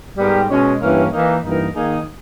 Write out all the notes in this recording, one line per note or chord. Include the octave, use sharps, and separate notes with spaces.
G#2 G3 B3 G4 A#4
B2 G#3 C#4
G2 E3 A#3 C#4
E3 A#3 D#4
G2 E3 A#3 D#4 A#4
D#3 A#3 D#4 G#4